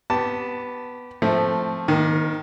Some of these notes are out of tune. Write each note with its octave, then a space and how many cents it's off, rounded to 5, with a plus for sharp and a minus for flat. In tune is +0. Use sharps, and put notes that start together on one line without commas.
B3 +0 G4 -15 A5 +10
F3 +0 A3 +0 C4 +0
D#3 +0 A#3 +40